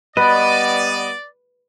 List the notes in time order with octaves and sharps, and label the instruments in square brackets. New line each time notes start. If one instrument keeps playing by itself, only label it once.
[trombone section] G3 B3 [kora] B4 [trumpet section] D5 [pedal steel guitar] D#5